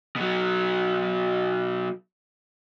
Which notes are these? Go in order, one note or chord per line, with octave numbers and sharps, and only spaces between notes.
B2 F#3